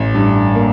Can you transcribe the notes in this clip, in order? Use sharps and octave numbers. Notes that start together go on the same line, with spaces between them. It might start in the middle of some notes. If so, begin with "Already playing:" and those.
Already playing: A1
G2
A#3